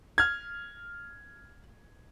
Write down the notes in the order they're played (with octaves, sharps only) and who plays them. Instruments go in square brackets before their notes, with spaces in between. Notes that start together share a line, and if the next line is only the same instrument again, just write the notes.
[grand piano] F6 G#6